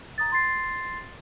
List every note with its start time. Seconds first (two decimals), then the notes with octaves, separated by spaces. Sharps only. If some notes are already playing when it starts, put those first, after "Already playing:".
0.18 A#5 D#6 A6
0.32 C6 A6 C7